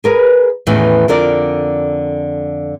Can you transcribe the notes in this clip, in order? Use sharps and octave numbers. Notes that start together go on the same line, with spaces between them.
G#4 A#4 B4
E2 A2 D#3 E3 C#4
F2 D3 A#4 D5